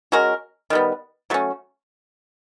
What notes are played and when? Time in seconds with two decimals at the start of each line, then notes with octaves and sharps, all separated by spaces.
0.12 G#3 C#4 F#4 A#4
0.70 D#3 G3 B3
1.30 F#3 A3 C#4